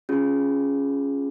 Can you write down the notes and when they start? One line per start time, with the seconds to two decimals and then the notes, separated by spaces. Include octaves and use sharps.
0.09 C#4 F4 G#4